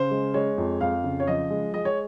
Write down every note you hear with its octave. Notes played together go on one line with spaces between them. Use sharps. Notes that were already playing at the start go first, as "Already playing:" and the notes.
Already playing: C#3 C5
G#3
G#3 C#5
F2
F2 F5
C#3
C#5
F3 D#5
G#3
G#3 D#5
C#5